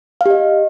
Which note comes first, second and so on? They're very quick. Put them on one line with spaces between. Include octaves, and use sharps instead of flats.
F5 G4 D#5